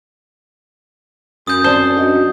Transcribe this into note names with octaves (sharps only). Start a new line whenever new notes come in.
F#2 D#6 G6
C4 C5 D5 A5
D4 F#4 D#5